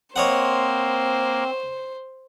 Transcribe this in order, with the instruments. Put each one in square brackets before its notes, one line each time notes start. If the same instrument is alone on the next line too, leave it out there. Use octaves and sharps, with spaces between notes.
[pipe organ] A#3 [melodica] C4 [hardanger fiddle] C5 [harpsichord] C#5 D#5 F#5